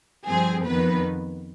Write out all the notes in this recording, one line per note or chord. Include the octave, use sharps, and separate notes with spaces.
G2 F3 C4 G#4
F2 D#3 B3 B4